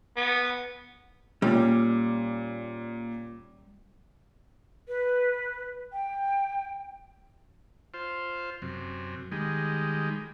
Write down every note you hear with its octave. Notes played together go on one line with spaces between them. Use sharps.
B3
A#2 G3 C#4
B4
G5
F4 C5
F#2 C3
D#3 G3 G#3